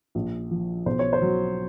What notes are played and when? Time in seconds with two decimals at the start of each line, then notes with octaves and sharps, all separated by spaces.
0.15 A#1
0.51 F3
0.86 B1 C5
0.99 C#5
1.13 C5
1.22 F#3